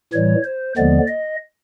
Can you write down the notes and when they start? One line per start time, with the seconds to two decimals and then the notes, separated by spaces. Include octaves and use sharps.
0.13 A2 E3 G3 C#5
0.44 C5
0.77 D#2 D3 F3 G#3 B3 D5
1.07 D#5